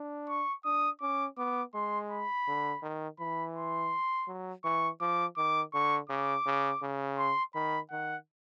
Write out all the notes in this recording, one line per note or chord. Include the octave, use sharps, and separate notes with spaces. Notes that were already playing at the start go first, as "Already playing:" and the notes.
Already playing: D4
C#6
D4 D#6
C#4 D6
B3 D6
G#3 C6
B5
D3
D#3
E3 B5
C6
F#3
E3 C#6
F3 D6
D#3 D6
D3 C#6
C#3 D6
C#3
C#3
C6
D#3 B5
D#3 F#5